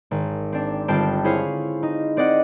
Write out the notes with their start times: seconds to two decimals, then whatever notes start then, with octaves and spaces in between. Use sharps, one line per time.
0.11 G#1
0.53 C4 D4
0.88 G1 C4 F4 G5 A5 E7
1.24 E4 G#4 C5 C#5 F5
1.83 D#4
2.17 C4 D5 D#5 F#5